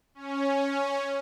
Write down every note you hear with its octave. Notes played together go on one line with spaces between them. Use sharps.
C#4